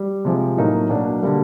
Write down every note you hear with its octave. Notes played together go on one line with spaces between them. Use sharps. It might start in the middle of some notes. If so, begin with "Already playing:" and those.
Already playing: G3
C3 F3 G#3
A2 F#3 A#3 D#4
B2 F#3 A#3 D4
D3 G3 A#3